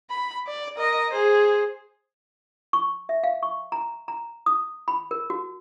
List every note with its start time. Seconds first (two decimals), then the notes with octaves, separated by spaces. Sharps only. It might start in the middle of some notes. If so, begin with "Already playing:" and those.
0.10 B5
0.47 D5
0.77 A#4 D#5
1.13 G#4 C5
2.73 C#6
3.09 E5
3.23 F5
3.43 C#6
3.72 A#5
4.08 A#5
4.46 D#6
4.88 B5
5.11 A#4
5.30 F#4